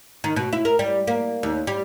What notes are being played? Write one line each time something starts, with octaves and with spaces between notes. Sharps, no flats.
D#3
B2
E4
A#4
G3
A#3
D#2
G3